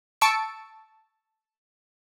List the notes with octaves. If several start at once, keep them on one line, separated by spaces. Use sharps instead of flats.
A5 C#6 E6 C#7 D7